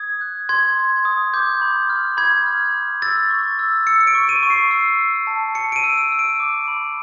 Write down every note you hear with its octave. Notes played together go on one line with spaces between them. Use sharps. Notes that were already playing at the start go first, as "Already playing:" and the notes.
Already playing: D#6 G#6
F#6
C6 G#6
C6
D#6
D6 G6
B5
F6
B5 G#6
F6
B5
E6 A6
C#6
E6
E6 C#7
C#7
D7
C#6
D#7
C#6
C7
E6
E6
A5
A5 C#7
D7
D#7
E6
D#7
E6
D7
D6
B5